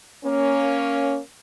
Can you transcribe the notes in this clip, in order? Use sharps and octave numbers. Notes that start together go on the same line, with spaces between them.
A#3 C#4